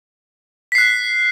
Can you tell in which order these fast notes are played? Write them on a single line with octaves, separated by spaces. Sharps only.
B6 C7 F#6